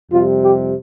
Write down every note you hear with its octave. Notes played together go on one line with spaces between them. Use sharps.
F2 C3 G3 F4
G4